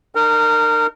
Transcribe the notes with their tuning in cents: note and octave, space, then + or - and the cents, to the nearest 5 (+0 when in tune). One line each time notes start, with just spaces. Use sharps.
D#4 -40 A#4 -20